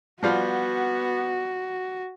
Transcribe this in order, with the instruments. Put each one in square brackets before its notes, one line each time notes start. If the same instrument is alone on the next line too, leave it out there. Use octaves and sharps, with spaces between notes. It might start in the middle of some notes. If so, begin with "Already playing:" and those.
[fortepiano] F3 G3 F4 [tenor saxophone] B3 [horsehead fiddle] F#4